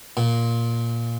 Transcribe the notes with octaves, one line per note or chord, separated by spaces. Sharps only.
A#2